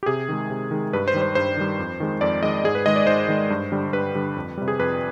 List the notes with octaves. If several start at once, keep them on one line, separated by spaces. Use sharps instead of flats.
G4
C3 G#4
D#3 G#3
C3
D#3 G#3
G2 B4
C5
D#3 G3
C5
G2 C5
D#3 G3
F2
D#3 G#3
F2 D5
D#3 G#3 D#5
G#2 G#4
B4
D#3 G#3 D#5
D5
G#2 C5
D#3 G#3
G2
D3 G3
G2 B4
D3 G3
F2
C3 G3
G#4
F2 B4